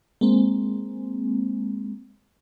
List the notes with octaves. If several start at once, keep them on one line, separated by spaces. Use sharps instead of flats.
G#3 A#3 C4